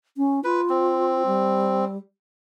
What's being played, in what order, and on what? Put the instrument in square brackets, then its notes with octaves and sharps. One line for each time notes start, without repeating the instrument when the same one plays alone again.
[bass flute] C#4
[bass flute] F4 [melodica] B4
[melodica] C4
[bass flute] G3